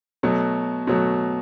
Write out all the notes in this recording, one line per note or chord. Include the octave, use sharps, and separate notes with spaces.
B2 F#3 A3
B2 F#3 A3